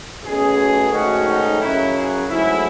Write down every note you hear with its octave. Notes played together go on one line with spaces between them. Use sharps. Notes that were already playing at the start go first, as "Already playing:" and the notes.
B1 B2 A3 C#4 G#4
G#2 D#3 A3 C#4 F#4
D#4
F#2 C#3 F#3 E4
G#4
G#2 F#3 A3 C#4 E4